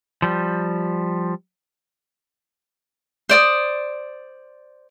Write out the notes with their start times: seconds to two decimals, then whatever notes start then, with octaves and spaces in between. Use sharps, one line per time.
0.22 F3 G3
3.29 C5 D5 D#6